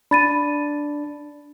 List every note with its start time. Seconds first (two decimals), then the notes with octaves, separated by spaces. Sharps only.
0.11 D4 B5 A6 D#7